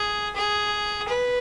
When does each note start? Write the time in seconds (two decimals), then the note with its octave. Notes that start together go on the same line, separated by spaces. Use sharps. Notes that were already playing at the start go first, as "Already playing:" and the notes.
Already playing: G#4
0.35 G#4
1.08 B4